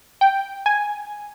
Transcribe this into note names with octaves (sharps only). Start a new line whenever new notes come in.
G5
G#5